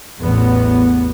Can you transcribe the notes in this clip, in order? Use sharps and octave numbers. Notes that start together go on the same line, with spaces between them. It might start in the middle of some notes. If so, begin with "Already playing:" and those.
A1 E2 A2 B3